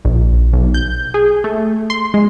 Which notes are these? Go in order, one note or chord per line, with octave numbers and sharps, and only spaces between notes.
A#1
B1
G6
G#4
A3
C6
G#3